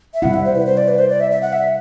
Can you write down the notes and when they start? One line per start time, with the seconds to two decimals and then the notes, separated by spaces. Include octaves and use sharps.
0.14 E5
0.22 C3 G3 C4 E4 F#5
0.34 E5
0.45 C5
0.55 B4
0.66 C5
0.77 D5
0.88 B4
0.99 C5
1.10 D5
1.20 E5
1.31 E5
1.42 F#5
1.53 E5